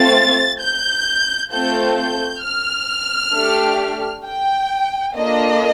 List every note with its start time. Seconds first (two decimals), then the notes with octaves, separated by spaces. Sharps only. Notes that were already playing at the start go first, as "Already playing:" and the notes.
Already playing: A3 C4 F4 A6
0.60 G6
1.51 A3 C4 F4 A4 G6
1.96 G6
2.43 F6
3.34 A3 D4 G4
4.26 G5
5.17 A#3 D4 F4 A4 D#5